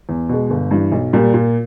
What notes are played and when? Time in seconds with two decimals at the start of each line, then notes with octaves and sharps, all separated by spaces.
0.09 E2
0.29 B2 G#3
0.50 G1
0.71 G2 E3
0.92 B1
1.13 A#2 G3
1.34 A#2